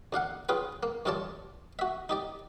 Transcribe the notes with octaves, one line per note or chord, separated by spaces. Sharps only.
D2 D4 F5 F#5
C#4 F4 G#4 B4 G5
A#3
D2 G2 F4 C#5 D5 A5
F#4 E5
D#4 G4 D5